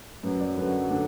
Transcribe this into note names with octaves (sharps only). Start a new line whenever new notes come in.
F#2 F#3 B4
D5
F#2 D3 F#3 B4
F#4
D3 F#3 D4